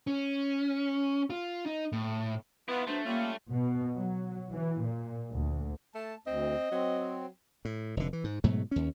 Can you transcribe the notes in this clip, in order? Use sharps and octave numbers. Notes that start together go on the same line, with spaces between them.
C#4
F4
D#4
A2
B3 E4 F4
F#3 A3 B3 D4 C5
G3 A#3 C#4 F4
B2
F#3
E3
A#2
D2
A3 A5
D2 C4 D#5
F#3 C4
A2
F1 D3
E3
G#2
G#2 B2 F#3 A3
D#2 C#4